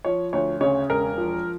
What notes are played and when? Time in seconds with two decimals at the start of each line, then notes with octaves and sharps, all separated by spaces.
0.04 F3 C#5
0.33 D2 C#5
0.61 C#3 C#5
0.89 E1 A#4
1.18 F3